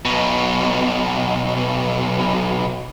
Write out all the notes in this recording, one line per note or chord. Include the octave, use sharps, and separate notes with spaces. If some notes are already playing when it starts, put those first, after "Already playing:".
B1 B2